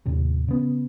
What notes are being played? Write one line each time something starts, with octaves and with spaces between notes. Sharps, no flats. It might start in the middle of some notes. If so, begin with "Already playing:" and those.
D#2 A2 C3
C#3 B3